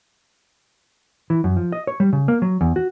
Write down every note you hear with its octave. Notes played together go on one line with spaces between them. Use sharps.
E3
F#2
F3
D#5
C#5
G3
C#3
A#3
F#3
E2
F#4